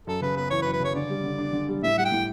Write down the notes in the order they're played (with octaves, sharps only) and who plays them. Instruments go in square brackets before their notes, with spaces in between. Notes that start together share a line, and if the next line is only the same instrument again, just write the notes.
[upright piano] F#2 [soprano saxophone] A4
[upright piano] C#3 [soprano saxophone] B4
[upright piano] B3 [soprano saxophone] B4
[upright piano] E3 [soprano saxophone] C#5
[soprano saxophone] B4
[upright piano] F#2
[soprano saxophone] B4
[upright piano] C#3 [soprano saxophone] C#5
[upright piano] D3 [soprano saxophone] D5
[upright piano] G3
D3
D4
D3
G3
[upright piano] A2 [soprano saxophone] E5
[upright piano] G3 [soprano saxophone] F#5
[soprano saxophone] G5
[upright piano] A2